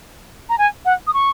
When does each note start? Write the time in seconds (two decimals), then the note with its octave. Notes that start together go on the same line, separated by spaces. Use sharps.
0.49 A#5
0.58 G#5
0.85 F#5
1.07 D#6
1.14 C#6